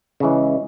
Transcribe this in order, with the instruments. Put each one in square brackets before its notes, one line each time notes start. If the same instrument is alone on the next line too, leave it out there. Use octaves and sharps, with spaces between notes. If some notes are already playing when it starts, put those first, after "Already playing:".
[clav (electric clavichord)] C#3 E3 G#3